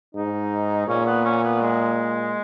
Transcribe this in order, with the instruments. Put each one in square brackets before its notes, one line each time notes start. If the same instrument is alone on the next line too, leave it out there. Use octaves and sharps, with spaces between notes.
[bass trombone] G#2 [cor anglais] D#4
[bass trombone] A#2 [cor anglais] C#4
[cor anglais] B3
C#4
B3
G#3